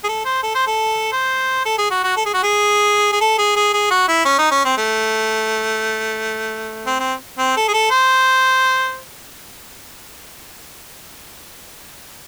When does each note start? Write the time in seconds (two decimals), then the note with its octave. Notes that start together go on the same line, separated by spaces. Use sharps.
0.04 G#4
0.09 A4
0.25 C5
0.43 A4
0.55 C5
0.67 A4
1.12 C5
1.65 A4
1.78 G#4
1.91 F#4
2.04 F#4
2.17 A4
2.26 G#4
2.34 F#4
2.43 G#4
3.13 G#4
3.21 A4
3.38 G#4
3.56 G#4
3.74 G#4
3.91 F#4
4.08 E4
4.25 C#4
4.39 D#4
4.51 C#4
4.65 C4
4.78 A3
6.86 C4
7.00 C4
7.38 C4
7.57 A4
7.68 G#4
7.74 A4
7.90 C5